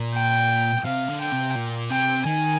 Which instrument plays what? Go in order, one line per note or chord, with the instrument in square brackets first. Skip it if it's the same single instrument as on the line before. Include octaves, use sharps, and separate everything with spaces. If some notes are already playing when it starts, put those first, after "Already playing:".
Already playing: [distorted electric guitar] A#2
[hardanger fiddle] G5
[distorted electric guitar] C3 [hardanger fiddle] F5
[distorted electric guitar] D3
[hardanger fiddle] G5
[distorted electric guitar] C3
A#2
[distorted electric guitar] C3 [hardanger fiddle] G5
[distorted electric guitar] D#3 [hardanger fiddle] G#5